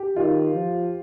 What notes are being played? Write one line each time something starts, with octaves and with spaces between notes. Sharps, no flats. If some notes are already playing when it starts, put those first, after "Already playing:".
Already playing: G4
D#3 F4
F3